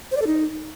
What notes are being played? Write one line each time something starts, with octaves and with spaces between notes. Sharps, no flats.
C5
D5
A4
D#4